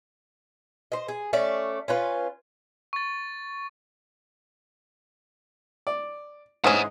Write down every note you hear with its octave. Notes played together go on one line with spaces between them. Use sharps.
C5 D#5
G#4
A3 C#4 D5
C#4 F4 B4
C#6 A6
D5
G#2 E3 C#4 C5 C#5 D#5 F#5